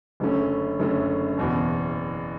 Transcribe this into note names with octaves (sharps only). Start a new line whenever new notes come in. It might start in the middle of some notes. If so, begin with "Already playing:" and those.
F#1 F#2 D3 A3 C#4
F#1 F#2 D3 A3 C#4
F#1 E2 B2